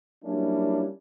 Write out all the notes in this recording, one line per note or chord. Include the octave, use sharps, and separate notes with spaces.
F#3 G3 A#3 C#4 D4 E4